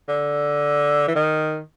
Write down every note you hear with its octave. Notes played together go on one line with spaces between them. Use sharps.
D3
E3
D#3